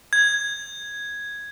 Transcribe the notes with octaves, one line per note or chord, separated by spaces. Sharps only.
G#6